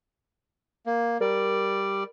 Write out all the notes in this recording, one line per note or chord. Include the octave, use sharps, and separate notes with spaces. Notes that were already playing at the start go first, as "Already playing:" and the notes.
A#3
G3 A#4 D5